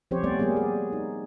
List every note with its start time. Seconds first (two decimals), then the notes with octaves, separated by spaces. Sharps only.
0.11 F3 C4 C#4 G4 C5 C#5
0.23 G3 A3 B3 C#4 C5 D5
0.39 G3 A#3 B3 C#4 G#4
0.57 G#4
0.93 D#4